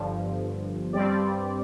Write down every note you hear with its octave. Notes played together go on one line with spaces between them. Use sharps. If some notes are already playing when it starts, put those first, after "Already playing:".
Already playing: G1 G2 D3 F3
G2 G3 C4 G4 D5